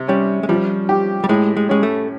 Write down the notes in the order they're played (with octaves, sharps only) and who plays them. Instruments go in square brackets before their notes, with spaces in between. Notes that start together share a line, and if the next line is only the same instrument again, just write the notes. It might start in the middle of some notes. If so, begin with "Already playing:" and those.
Already playing: [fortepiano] C3
[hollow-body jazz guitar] G3 [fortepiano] C#4
[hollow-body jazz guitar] G#3
[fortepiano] F3 [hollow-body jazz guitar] G3
[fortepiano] G4
[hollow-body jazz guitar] G3
[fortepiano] A2 [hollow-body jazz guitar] G#3
[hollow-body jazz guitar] G#3
[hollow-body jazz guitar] G#3 [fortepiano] C#4
[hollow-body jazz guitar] A3